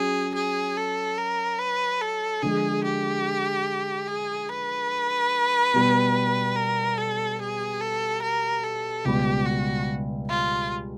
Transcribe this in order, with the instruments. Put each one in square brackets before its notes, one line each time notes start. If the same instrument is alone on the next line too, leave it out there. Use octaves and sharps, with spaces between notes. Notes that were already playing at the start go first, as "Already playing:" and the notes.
Already playing: [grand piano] F#3 C#4 [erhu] G#4
[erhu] G#4
A4
A#4
B4
A4
[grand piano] D3 F3 G#3 [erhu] G#4
[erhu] G4
G#4
B4
[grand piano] B2 G3 B3
[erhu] A#4
A4
G#4
A4
A#4
A4
[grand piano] C#2 B2 G3 [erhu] G4
[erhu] F#4
F4